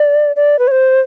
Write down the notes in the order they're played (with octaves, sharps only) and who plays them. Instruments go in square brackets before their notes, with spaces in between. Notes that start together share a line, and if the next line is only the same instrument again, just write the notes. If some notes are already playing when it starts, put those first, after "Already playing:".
Already playing: [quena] D5
D5
B4
C#5
C5